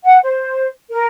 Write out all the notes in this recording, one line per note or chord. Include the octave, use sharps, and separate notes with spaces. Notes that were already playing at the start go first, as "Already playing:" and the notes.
F#5
C5
A#4